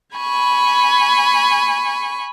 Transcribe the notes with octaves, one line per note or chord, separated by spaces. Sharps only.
G#5 B5 C#6